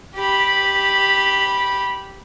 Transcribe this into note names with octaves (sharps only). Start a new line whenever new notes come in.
G4 B5